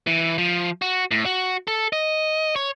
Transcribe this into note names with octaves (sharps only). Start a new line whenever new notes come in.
E3
F3
F#4
A2
F#4
A4
D#5
C#5